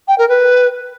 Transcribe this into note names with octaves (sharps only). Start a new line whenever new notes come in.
G5
A#4
B4